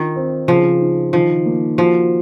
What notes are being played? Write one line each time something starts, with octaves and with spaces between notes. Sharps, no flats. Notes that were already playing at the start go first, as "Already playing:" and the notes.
Already playing: D#3 F4
C4
C#3 F3
D#4
D#3 F3
A#3
F3 F#4